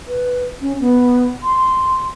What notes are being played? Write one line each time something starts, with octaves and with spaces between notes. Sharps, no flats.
B4
C#4
B3
C6